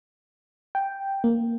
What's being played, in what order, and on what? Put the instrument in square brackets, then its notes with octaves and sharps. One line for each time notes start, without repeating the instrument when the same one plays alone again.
[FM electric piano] G5
A#3